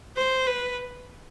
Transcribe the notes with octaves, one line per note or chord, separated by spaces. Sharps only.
C5
B4